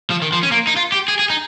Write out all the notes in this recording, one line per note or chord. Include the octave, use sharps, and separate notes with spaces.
F3
D#3
F3
C#4
A#3
D#4
F4
G4
G#4
G#4
D#4